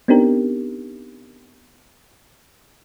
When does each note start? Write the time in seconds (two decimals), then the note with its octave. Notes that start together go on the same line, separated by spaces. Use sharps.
0.08 B3 C4 D4 D#4 G4 A#4